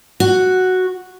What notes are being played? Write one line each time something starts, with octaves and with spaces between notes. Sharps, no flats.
F#4